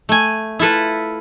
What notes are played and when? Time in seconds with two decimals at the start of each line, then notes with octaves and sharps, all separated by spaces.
0.09 A3 G#5
0.59 E4 F4 A4 B4